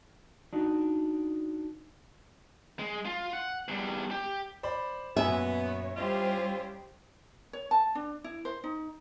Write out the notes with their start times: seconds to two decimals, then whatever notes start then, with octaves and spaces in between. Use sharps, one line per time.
0.53 D4 D#4 F#4
2.79 G#3
3.05 F4
3.33 F#5
3.68 E2 G3
4.11 G4
4.63 C5 D5 B5
5.16 F#2 A#2 B3 C#5 E5 G#5
5.96 G3 C#4 E4 F4 G4 C5 D#5
7.53 C#5
7.71 A5
7.95 D4
8.24 E4
8.45 C5
8.64 D#4